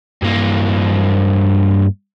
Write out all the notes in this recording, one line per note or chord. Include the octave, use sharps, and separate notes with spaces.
G2 A#3